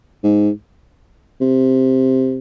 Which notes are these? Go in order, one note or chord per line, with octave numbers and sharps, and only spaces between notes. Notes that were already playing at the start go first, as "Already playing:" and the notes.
G#2
C3